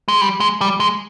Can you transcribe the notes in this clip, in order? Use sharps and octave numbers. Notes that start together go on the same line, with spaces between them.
G#3
G3
G#3
G3
G#3